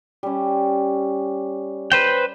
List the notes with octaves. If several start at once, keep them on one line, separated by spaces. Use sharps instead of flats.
G3 C#4
B4 C5 G5